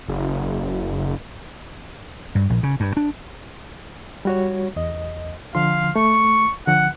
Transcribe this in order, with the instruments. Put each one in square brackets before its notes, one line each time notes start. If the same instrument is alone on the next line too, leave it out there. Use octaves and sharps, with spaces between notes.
[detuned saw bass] F#1
[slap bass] G2
A#1
C#3
G2
D4
[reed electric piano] G3 F#4 C#5
E2 D#5
[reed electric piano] D3 F3 C6 [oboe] F5
[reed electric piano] A3 [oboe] C#6
[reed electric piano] D3 F3 [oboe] F#5